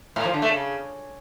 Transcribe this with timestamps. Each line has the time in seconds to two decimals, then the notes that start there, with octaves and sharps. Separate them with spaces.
0.16 A2
0.25 F3
0.33 D3
0.42 A3
0.51 C#3